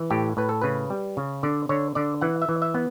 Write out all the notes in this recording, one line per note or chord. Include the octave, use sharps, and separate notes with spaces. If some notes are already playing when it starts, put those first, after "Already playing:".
Already playing: E3
A2 G4
A2 B4
A4
C#3 B4
G3
C#3
D3 D5
D3 C#5
D3 D5
E3 F#5
E5
E3
E5
B3